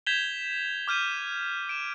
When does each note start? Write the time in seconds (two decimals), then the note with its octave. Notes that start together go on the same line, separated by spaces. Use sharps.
0.06 G6 G#6 B6 E7 F7 G7
0.88 D6 F6 G6 D#7
1.69 D7 E7